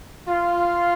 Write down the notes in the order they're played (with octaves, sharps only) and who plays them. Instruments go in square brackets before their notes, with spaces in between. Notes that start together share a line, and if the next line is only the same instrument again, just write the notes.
[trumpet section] F4